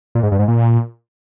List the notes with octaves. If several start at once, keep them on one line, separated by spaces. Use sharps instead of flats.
A#2
G#2
G2
G#2
A#2